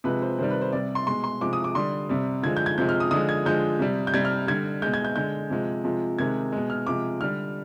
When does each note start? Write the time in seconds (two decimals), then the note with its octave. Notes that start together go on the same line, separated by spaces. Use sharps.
0.04 C3 F3 G#3 B4
0.22 C5
0.38 C3 D#3 G3 C5
0.50 B4
0.61 C5
0.72 C3 G3 D5
0.95 C6
1.07 B2 G#3 C6
1.24 C6
1.41 C3 F3 G#3 D6
1.53 D#6
1.64 D6
1.75 D3 G3 C6
2.09 C3 G3
2.43 D3 F3 G#3 G#6
2.57 G6
2.66 G#6
2.78 C3 F3 G#3 G6
2.89 F6
3.00 D#6
3.11 D3 F3 G#3 D#6
3.29 G#6
3.45 D3 F3 G#3 G6
3.79 C3 G3
4.07 G6
4.14 C3 G3 G#6
4.25 F6
4.47 D3 G3 G#6
4.82 B2 G#3 G6
4.94 G#6
5.05 G6
5.16 D3 G#3 G6
5.50 C3 F3 G#3
5.84 C3 F3 G#3
6.19 C3 D#3 G#3 G#6
6.52 B2 G#3
6.70 F6
6.87 C3 F3 G#3 D6
7.21 D3 G3 F6